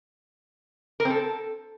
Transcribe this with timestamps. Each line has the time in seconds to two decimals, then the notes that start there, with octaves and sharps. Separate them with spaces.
1.00 A#4
1.05 C4
1.10 A4